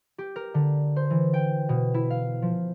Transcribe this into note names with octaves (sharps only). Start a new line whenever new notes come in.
G4
A#4
D3
C5
E3
G5
B2
E4
F5
F3